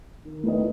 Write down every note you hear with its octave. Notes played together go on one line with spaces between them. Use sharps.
D#3
A3 E4 B4 D#5